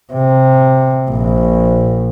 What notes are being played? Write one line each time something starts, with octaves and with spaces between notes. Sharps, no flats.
C3
A#1